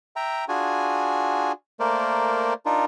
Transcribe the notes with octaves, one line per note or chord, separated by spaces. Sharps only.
E5 G5 A#5
D4 F4 F#4 G#4 G#5
A3 A#3 A#4 C5 D5
D4 D#4 F4 A#4